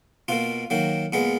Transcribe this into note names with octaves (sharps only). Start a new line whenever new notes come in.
B2 A#3 F4
D#3 F#3 A#3
A#2 G#3 B3